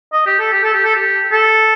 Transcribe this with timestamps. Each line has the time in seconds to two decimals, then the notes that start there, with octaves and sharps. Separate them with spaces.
0.13 D#5
0.26 G4
0.40 A4
0.52 G4
0.64 A4
0.73 G4
0.85 A4
0.95 G4
1.32 A4